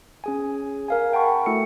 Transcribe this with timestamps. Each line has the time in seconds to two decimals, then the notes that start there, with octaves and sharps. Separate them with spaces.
0.24 C#4 G#4 G#5
0.89 A#4 F5 G#5
1.12 F#5 G5 A5 B5 C#6
1.46 A3 E4 F#4 A4 C#7